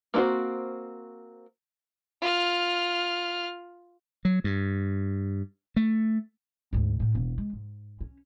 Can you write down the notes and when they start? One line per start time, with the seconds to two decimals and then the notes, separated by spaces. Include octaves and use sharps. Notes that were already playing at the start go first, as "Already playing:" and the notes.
0.14 A#3 C4 E4 F#4 C5
2.22 F4 F6
4.25 F#3
4.44 G2
5.76 A3
6.73 D2 G#2
7.00 A2 A3
7.15 E1
7.38 G#3
7.53 G#2
8.01 C#4